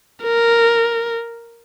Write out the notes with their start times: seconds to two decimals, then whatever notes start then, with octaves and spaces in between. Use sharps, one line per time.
0.24 A#4